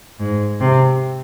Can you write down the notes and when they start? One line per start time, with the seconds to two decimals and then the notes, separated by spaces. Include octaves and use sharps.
0.20 G#2
0.61 C3